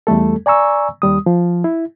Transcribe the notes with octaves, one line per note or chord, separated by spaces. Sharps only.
E2 G3 A3 A4
D5 G#5 A#5 C#6 E6
D#2 G3 D#6
F3
E4